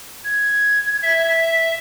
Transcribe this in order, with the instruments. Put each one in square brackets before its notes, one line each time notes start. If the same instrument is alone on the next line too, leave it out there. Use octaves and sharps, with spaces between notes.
[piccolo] G#6
[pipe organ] E5